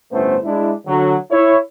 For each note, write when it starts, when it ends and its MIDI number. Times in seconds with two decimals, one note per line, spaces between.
0.11 0.36 31
0.11 0.36 45
0.11 0.36 57
0.11 0.36 59
0.11 0.36 61
0.11 0.36 72
0.44 0.71 56
0.44 0.71 62
0.44 0.71 64
0.86 1.15 50
0.86 1.15 54
1.30 1.56 64
1.30 1.56 73